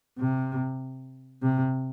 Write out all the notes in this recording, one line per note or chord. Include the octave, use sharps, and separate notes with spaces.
C3
C3